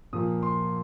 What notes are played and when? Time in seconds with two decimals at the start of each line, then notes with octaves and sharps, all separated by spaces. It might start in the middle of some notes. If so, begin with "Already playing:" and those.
0.13 A#2 F3 A#3 D#6
0.43 C6